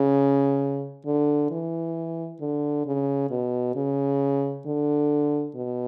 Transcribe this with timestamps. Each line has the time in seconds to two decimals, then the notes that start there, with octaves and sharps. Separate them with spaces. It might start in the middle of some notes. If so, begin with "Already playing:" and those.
Already playing: C#3
1.06 D3
1.51 E3
2.41 D3
2.86 C#3
3.30 B2
3.75 C#3
4.65 D3
5.55 B2